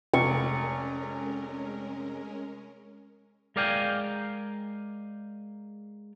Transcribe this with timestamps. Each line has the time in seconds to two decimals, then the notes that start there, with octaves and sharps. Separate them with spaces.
0.14 F1 G#3 C#4 A#4 C#6
3.56 G#3 A#4 D5 F5 G5 G#5